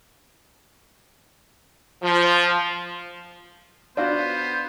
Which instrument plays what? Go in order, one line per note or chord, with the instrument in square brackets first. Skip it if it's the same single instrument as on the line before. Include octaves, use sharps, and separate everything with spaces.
[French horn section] F3
[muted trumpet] B3 [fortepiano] D4 F4 F#4 [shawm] C5